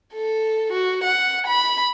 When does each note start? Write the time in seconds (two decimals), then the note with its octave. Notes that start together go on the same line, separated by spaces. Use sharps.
0.13 A4
0.73 F#4
1.04 F#5
1.47 B5